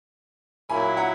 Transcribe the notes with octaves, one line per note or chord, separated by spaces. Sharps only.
A#2 F#3 A#3 E4 G#5 B5
F#5 A#5